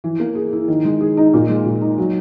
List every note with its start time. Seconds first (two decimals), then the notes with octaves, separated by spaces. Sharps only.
0.04 E3
0.20 A#3
0.35 G#4
0.53 E4
0.68 D#3
0.85 G#3
1.01 G#4
1.17 D#4
1.34 A#2
1.50 G#3
1.65 A#2
1.81 D#4
1.98 F#3